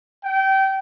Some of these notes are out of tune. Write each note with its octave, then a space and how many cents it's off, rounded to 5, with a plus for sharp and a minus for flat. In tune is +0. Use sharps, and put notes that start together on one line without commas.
G5 -25